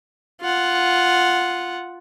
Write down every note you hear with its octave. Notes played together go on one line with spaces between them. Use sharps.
F4 F#5